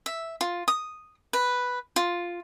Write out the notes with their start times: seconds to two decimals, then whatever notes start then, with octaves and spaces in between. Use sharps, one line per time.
0.06 E5
0.41 F4
0.68 D#6
1.33 B4
1.96 F4